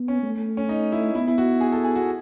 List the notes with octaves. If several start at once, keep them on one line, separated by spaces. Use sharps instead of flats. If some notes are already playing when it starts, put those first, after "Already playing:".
Already playing: B3
C#4
A3
C#4
D#4
E4
B3 E4
E4
F#4
G#4
A4
G#4
F#4